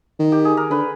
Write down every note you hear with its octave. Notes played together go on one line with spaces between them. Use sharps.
D#3
G4
G#4
A#4
D3 B4